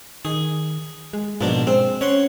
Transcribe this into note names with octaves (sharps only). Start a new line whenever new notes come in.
D#3 G#4
G#3
A#1 G#2 B2 D4
G#3 C4
C#4 C#5 F#5 C6